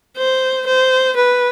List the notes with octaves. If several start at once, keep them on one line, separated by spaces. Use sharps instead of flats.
C5
C5
B4